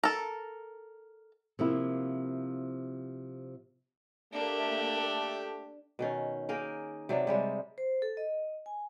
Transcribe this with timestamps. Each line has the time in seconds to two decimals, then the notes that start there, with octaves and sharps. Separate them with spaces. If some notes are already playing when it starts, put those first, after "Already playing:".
0.03 A4 A#4
1.59 C3 F3 A#3 E4
4.33 A3 A#3 D4 G4 E5
5.99 B2 D#3 C#4
6.49 A#3 G#4 A#4 G5
7.09 C3 F#3 D4
7.27 C3 G3 G#3
7.78 C5
8.02 A4
8.17 D#5
8.66 G#5